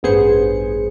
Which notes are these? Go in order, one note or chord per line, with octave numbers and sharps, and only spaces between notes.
A1 G2 B3 G#4 C5 C#7